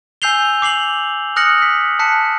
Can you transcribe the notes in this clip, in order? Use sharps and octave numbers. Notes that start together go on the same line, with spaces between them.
G#5 E6 G6 C7 F7 G7
D6 C7 F7 F#7
D#6 F6 F#6 A#6 C#7 F#7
B6
A5 F#6 B6 C#7